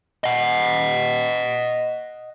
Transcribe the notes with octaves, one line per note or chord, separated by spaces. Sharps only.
D#5 F#5